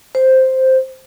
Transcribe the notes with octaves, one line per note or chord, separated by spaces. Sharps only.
C5